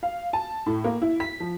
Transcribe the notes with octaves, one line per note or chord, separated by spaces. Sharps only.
F5
A5
A2
A#3
E4
B6
F3